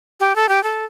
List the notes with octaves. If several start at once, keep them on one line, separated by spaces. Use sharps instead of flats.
G4
A4
G4
A4